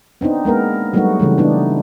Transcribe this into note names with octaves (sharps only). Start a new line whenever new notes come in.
B3 C4 D4 D#4
G#3 A#3 B3 A#4
F#3 G3 A3 B3 D#4 F#4
C#3 E3 G3 A3
B3 D4 D#4